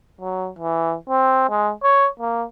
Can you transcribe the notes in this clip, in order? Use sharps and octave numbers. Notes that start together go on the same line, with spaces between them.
F#3
E3
C4
G#3
C#5
A#3